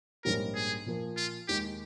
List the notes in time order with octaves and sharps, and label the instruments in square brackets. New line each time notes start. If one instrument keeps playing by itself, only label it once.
[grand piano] A#1 G#2 G3 A#3 C#4 [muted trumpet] A#4
[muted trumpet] G#4
[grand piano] A#2 F3 A#3
[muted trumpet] F4
[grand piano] D#2 D#3 G#3 D#4 [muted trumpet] G4